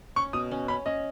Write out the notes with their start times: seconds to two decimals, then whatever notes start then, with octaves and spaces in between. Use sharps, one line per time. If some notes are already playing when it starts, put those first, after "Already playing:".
0.16 C#4 C#6
0.33 B2 D#6
0.51 C#4
0.68 C#4 B5
0.86 C#4 D#5